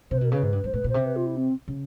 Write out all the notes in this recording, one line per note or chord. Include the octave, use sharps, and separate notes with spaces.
C3 C5
B4
B2 A#4
C#3 B4
G#2
G2
G2 C5
A2 B4
A#2 C5
C3
B4
F4
E4
C4
C#3